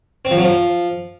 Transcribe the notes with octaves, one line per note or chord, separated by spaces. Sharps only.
C4
F3
F#3
F3